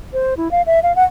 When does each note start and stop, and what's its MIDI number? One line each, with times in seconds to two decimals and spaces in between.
0.13 0.34 72
0.37 0.51 64
0.51 0.62 77
0.66 0.80 76
0.83 0.95 77
0.96 1.04 78